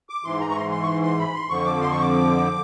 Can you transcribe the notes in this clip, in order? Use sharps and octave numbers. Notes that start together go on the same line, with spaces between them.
D6
G#2 E3 C6
A#5
C#6
C6
C6
C#6
C6
C6
B5
C6
F2 D3 F3 C#6
D6
C6
C#6
D6